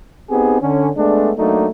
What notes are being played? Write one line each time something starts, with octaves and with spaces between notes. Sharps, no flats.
B3 C4 D#4 G4 G#4
D3 C#4
G#3 A3 B3 D4
F#3 A3 A#3 D4 D#4